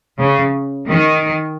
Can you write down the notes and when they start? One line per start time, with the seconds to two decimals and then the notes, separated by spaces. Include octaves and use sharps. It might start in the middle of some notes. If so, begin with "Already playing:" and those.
0.20 C#3
0.88 D#3